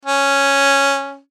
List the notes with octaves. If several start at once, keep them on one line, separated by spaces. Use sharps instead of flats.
C#4